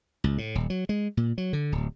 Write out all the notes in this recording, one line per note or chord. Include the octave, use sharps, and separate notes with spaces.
C#2
A2
D#1
F#3
G#3
A#2
F#3
D3
D1